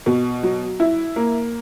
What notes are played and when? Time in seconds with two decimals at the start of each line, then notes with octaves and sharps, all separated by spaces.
0.06 B2
0.43 F#3
0.80 E4
1.16 A#3